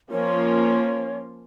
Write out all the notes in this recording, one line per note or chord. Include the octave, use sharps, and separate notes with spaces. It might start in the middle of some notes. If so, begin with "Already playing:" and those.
F3 A#3 C#4 F4 C#5